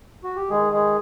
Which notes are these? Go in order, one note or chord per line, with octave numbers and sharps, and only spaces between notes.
F#4
G4
D#3 G#3 G#4
D#3
G#3 G#4